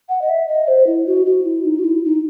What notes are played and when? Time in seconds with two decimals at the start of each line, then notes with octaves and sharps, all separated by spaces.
0.09 F#5
0.22 D#5
0.29 E5
0.48 D#5
0.68 C5
0.87 E4
1.07 F#4
1.26 F#4
1.46 E4
1.65 D#4
1.79 F#4
1.84 E4
2.05 D#4